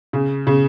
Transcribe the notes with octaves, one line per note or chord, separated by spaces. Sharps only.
C#3
C#3